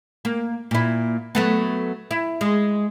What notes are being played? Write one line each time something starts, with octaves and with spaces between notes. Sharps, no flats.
A#3
A#2 E4
F#3 A3 B3
E4
G#3